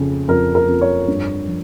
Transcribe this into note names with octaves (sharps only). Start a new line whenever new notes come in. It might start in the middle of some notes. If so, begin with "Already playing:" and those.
Already playing: F2 C#3
F2 A#4
A#4
F2
C#5
G2
F3